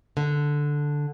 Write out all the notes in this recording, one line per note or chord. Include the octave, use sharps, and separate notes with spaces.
D3